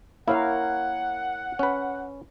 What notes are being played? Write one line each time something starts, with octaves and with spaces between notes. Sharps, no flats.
A#3 E4 A#4 C#5 F5 F#5
C#4 B4